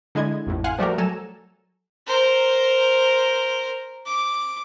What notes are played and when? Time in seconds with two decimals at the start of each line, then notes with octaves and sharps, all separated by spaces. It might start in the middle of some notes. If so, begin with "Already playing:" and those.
0.15 D3 G#3 E4 D#5 G#6
0.47 A1 F2 A2
0.64 F5 F#5 G#5 C6 F6 F#6
0.78 F3 G3 A3 F#4 G4 A#4
0.98 F#3 A4 G#5 A#5 E7
2.07 A#4 C5
4.06 D6